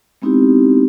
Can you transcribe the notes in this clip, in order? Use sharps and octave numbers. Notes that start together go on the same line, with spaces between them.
G#3 B3 C4 D#4 E4 G4